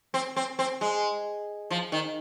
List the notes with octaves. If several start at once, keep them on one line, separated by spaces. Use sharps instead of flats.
C4
C4
C4
G#3
F3
D#3